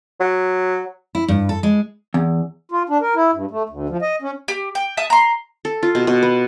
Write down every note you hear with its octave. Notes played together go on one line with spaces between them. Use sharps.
F#3
E4
G2
A4
G#3
E2
F4
D4
A#4
E4
G2
A3
D2
F3
D#5
C#4
G4
G5
E5 A5 D#6
A#5 C6
A4
F4
B2
B2
B3